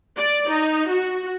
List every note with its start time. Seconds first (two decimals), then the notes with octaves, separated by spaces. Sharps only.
0.17 D5
0.49 D#4
0.89 F#4